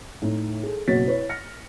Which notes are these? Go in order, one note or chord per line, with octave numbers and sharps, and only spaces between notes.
A2 D#4
G#4 A4
F#1 B2 F#4 C#5 A6 B6
E4 B4 C#5
F6 A#6 C#7